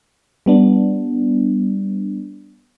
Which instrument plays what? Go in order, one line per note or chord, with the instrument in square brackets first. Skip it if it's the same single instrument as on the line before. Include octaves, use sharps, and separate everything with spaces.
[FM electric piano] G3 B3 D4